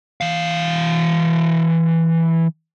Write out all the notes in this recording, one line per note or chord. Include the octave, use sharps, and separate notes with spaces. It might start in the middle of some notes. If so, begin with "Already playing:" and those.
E3 F5